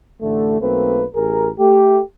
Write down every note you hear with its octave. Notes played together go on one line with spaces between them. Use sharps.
A1 D3 A3
B1 A3 A#3 C4 B4
A1 G#4 A#4
A3 G4